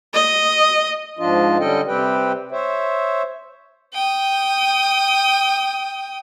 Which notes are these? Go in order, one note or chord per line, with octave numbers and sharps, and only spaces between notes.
D#5
G#2 F3 D4 F4 D#5
D3 G3 C#4 A4 D#5 G5
C3 G3 C4 G4 B4 G5
C5 C#5 E5
G5 D#6